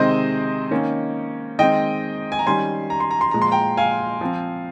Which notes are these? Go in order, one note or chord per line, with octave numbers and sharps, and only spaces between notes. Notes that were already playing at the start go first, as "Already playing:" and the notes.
Already playing: C3 D#3 G#3 C4 C5 D#5
D#3 A#3 C#4
D#3 G#3 C4 D#5 G5
G#5
A#5
D#3 G3 C#4 G#5 C6
A#5
C6
A#5
C6
A#2 F3 G#3 A#5
C6
G5 A#5
F5 G#5
F3 C4